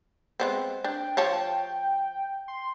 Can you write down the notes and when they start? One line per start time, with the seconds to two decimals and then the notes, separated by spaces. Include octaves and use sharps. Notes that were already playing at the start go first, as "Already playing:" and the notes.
0.40 G#3 B3 C4
0.84 D4 G5
1.17 F3 C#5 A5
2.48 C6